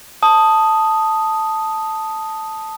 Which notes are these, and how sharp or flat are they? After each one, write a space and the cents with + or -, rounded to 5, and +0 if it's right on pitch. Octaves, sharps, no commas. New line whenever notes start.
A5 +0 D#6 +0